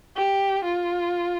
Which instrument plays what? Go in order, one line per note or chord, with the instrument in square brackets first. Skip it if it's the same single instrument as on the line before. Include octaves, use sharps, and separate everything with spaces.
[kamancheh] G4
F4